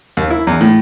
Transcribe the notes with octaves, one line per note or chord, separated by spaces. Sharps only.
D#2
E4
E2
A2